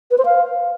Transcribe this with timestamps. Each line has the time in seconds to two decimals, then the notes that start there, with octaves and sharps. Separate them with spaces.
0.11 B4
0.18 C5
0.25 F5